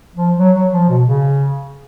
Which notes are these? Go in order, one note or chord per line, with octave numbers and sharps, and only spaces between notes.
F3
F#3
F#3
F3
B2
C#3